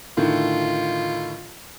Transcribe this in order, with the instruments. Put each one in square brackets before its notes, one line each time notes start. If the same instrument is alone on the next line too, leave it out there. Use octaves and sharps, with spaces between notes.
[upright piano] A2 D3 D#3 [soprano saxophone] F4